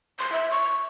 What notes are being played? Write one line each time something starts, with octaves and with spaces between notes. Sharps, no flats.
C6
E5
C#6